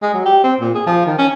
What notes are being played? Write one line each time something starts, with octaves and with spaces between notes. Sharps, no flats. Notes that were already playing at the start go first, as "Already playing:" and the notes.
G#3
F#3
G4
C4
A#2
G#4
F3
D#3
C#4